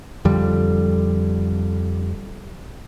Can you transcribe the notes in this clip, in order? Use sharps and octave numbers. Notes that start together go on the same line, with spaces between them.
F2 D3 G3